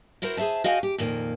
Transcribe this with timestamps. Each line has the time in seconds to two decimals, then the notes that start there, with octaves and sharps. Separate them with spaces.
0.22 E4 F#4 A#4 C5
0.37 G#4 C5 E5 A5
0.64 F#4 D#5 F5 G5 G#5
0.83 G4
0.98 F2 A#2 D#3 A#3